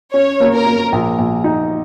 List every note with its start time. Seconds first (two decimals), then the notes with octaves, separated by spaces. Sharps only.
0.13 C#4 C#5
0.40 A#3
0.53 A#4
0.66 A#3
0.92 A#1
1.18 A#1
1.44 D#4